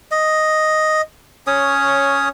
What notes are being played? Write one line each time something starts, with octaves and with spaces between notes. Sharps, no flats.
D#5
C#4 C#5 D#6